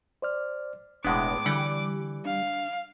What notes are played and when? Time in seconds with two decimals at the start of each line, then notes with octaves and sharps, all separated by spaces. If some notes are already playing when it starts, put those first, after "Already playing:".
0.22 C5 D5 F6
1.05 E1 A2 G#3 B3 D4 F#5 D6
1.46 D3 E3 G3 F#5 G5
2.25 D4 F5